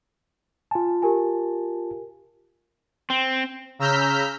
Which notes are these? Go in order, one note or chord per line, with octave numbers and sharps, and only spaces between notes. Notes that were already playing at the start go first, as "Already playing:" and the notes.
F4 G#5 A5
G4 A#4 G#5
C4
C#3 A#5 E6 F6 G6 B6